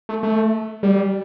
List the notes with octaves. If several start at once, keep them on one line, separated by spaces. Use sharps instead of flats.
A3
A3
G3